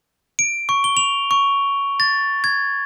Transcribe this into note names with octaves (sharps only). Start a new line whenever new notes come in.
D7
C#6
G7
F7
C#6
A6
G#6